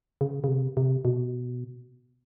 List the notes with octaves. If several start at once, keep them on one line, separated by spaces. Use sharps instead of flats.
C#3
C#3
C3
C3
B2